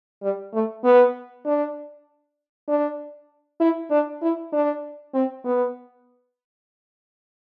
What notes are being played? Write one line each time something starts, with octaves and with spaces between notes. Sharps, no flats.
G3
A3
B3
D4
D4
E4
D4
E4
D4
C4
B3